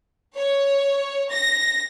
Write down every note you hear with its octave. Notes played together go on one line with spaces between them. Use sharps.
C#5
A#6